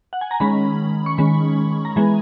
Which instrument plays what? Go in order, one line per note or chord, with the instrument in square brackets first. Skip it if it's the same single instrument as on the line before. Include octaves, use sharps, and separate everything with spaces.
[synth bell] F#5
G#5
A#5
D#3 G#3 C#4 B5
C#6
D#3 G#3 C#4 B5
A#5
E3 G#3 B3 G#5